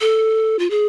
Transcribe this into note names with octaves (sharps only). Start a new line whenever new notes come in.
A4
F4
G#4